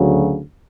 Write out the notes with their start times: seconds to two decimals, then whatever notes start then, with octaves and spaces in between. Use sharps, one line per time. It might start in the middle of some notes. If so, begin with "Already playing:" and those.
Already playing: D2 C#3 F#3